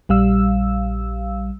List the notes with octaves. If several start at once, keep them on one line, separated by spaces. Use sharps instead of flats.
A#1 G3 F5 E6